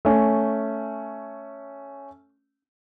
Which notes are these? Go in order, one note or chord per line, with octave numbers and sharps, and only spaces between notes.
A3 C#4